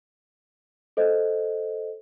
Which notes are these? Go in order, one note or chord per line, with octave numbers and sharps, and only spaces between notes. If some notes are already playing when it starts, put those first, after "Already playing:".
A4 C5 D#5